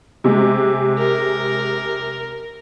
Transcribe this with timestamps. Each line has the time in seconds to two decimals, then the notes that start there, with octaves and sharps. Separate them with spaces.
0.24 C3 G#3
0.98 A#4